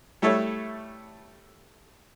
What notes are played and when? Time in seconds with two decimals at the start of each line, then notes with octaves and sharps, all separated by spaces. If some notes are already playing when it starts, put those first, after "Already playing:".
0.22 G3 A3 E4 A4 C#5 E5